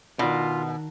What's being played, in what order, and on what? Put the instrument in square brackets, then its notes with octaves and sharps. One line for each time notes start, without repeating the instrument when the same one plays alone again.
[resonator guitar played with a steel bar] B2 [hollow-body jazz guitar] D#3 D4 [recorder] F4